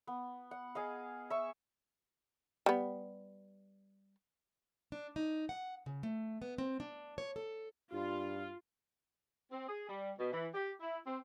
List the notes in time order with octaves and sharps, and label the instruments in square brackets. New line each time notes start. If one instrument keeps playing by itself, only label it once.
[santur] B3
F#5
G#4 D#5 F5
E5 C#6
[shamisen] G3 B3
[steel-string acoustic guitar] D4
D#4
F#5
C#3
A3
B3
C4
D4
C#5
A4
[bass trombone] G2 [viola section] F4
[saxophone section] C4
G#4
G3
B2
E3
G4
E4
C4